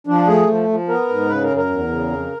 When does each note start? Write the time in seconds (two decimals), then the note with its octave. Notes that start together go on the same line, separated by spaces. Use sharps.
0.07 F3 D4
0.27 A3 G#4
0.47 F3
0.69 F3
0.88 B3 A#4
1.09 G#2
1.29 C#3 B4
1.43 A#4
1.50 F#2
1.57 A#4
1.69 E2
1.90 C#3
2.11 F2